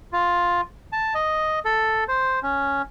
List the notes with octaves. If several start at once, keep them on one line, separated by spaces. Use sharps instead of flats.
F4
A5
D#5
A4
C5
C#4